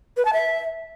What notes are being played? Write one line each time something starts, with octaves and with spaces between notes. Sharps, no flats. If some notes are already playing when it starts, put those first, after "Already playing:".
B4
A5
E5